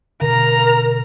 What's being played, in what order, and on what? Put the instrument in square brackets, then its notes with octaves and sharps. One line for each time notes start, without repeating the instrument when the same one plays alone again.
[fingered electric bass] B2 D3 [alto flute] A#4 [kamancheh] A#5